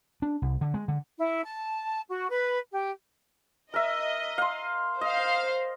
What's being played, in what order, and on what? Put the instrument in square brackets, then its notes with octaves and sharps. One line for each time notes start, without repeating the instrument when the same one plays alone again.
[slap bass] D4
C2
D3
G#3
D3
[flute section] E4
A5
F#4
B4
G4
[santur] A#4 E5 [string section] D#5
[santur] F5 C6
[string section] C5 F5 [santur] D#5